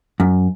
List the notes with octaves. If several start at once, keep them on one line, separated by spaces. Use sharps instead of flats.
F#2